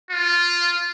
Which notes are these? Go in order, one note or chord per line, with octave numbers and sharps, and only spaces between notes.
F4